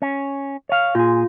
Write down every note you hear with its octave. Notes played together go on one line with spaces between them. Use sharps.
C#4
C#5 F5
A#2 F4 G#4